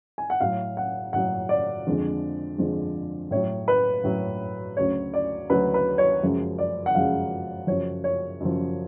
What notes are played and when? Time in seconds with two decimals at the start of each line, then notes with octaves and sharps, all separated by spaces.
0.18 G#5
0.30 F#5
0.41 A2 F#3 F5
0.77 F#5
1.13 A2 F#3 F#5
1.49 D5
1.87 F2 D3 F3 G#3
2.58 F2 D3 F3 G#3
3.31 A2 F#3 C#5
3.68 B4
4.04 A2 F#3
4.77 D2 C#3 F#3 C#5
5.14 D5
5.49 D2 C#3 F#3 B4
5.74 B4
5.98 C#5
6.22 F#2 C#3 F3 G#3
6.58 D5
6.86 F#5
6.95 F#2 C#3 F3 G#3 F5
7.67 F#2 C#3 F3 C#5
8.04 C#5
8.40 F#2 C#3 F3